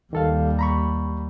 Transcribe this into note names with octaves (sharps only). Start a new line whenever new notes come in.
D#2 D#3 G3 A4 F5
A#5 B5 C#6